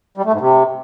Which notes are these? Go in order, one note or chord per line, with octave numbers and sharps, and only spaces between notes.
G3
A3
G#2
C3